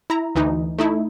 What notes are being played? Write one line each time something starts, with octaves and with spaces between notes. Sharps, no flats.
E4 A#5
D2 E3 D#4
A3 D#4 E4